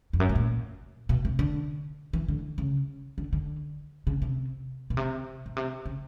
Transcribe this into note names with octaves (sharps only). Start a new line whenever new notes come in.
F2
F#2
A2
A#2
B2
C3
D3
E3
D3
C#3
D3
D3
C#3
C3
B2
C3
B2
C3
C#3